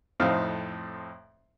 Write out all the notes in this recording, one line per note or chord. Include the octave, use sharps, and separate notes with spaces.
F2 A2 C4 D#4 F5